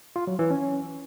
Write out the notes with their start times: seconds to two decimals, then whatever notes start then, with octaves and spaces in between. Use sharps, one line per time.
0.16 F4
0.27 F#3
0.39 E3
0.51 C#4